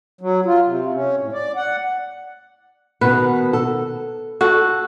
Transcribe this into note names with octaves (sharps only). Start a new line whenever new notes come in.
F#3
F4
C3
C#4
A2
D5
F#5
B2 D#3 B3 B4
A4
F#4 A4